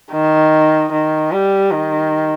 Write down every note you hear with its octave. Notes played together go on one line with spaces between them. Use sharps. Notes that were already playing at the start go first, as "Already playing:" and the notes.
D#3
D#3
G3
D#3